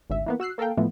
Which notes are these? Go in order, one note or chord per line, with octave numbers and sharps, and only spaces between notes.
G#1 D2 E5
E3 A#3 B3
F#4 E6 F#6 C7
A#3 A4 A#4 F5 G5
A2 E3 F3 A3 B3